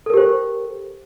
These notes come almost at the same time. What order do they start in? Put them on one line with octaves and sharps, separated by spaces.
A4 A#4 G4 C5